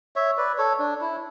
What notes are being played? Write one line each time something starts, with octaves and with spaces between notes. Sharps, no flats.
C#5 E5
B4 D5
A4 C#5
D4
E4